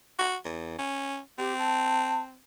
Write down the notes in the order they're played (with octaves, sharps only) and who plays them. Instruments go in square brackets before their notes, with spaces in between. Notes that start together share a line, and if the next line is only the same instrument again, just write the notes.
[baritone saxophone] F#4
E2
C#4
[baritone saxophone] C4 [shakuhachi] G4
[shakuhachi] A5